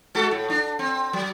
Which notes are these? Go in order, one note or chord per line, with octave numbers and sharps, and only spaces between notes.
G#3 F#4 A4
A2
D4
C4
F#3